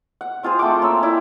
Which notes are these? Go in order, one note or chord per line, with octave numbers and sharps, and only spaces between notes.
F#5
C4 F4 G#4 C5
A3 F#5 G5 D6
A#3 C#4 E6
E4 D5